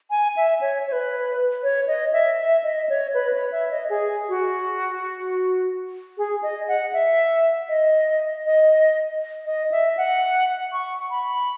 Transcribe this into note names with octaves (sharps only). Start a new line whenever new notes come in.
G#5
E5
C#5
C#5
B4
C#5
D#5
E5
E5
D#5
C#5
B4
C#5
E5
D#5
G#4
F#4
G#4
D#5
F#5
E5
D#5
D#5
D#5
E5
F#5
C#6
B5